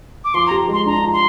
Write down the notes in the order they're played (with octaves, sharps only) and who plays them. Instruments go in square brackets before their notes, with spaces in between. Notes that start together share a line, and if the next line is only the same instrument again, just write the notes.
[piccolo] D6
[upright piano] F3 [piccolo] C6
[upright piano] G4 [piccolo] A#5
[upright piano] G#3 [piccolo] C6
[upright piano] D4 [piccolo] A#5
[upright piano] F3
[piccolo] C6